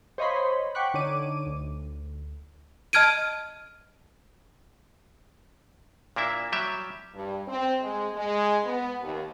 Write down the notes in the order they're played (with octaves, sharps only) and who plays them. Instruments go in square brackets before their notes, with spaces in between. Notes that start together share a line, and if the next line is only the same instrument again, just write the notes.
[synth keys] C5 C#5 D#5 F5 B5 C6
F#5 G5 C#6 D6 F#6 B6
D3 D4 D#4 C#5 D6 D#7
D2
[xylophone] D#5 A5 F6 G#6 D7 D#7
[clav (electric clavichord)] A#2 A#3 D4 E4 E5
F#3 G3 G4 E5
[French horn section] G2
C4
G#3
G#3
B3
D#2